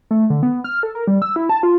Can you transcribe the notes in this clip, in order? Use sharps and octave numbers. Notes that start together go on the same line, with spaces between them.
A3
D3
B3
F6
A4
A#4
G3
E6
E4
A5
F4